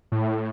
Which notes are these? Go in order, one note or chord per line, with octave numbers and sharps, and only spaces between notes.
A2